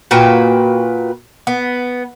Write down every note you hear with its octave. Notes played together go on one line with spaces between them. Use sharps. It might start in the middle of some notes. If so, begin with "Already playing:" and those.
A#2 F#4 B4 G5
B3